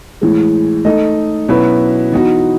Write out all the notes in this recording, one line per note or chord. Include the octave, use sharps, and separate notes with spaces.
A2 E3 G#3
A3 D#4 A4 D#5
B2 F#3 C#4 E4 B4
E3 B3 D#4 F#4